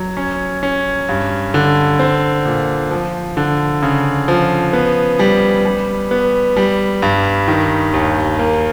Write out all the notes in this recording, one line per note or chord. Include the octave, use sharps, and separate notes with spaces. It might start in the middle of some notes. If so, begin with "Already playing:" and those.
Already playing: F#3
C#4
C#4
G2
D3
C4
A#2
F3
D3
C#3
F3
B3
G3
G3
B3
G3
G2
D#3
D#2
A#3